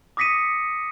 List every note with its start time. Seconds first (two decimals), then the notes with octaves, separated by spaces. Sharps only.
0.17 D6 D#6 A#6 B6 C#7 D#7